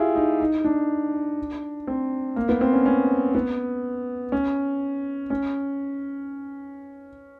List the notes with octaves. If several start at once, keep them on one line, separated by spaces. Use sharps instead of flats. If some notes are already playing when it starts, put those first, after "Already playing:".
Already playing: E4 F4 G4 G#4
D#4
D#4
D4
C4
A#3
B3
C4
C#4
C#4
B3
C#4
C#4